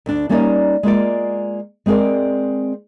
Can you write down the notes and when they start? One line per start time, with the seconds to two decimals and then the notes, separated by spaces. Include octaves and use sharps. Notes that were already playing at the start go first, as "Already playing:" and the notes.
0.06 D2 D4
0.29 G3 A#3 C#4 D#4 D5 D#5
0.83 G#3 A#3 F4 D5
1.86 G#3 C4 G#4 A#4 D5